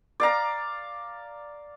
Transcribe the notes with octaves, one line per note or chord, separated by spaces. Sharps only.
D5 F5 A#5